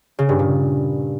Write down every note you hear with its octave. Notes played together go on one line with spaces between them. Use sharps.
C#3
G2
A#2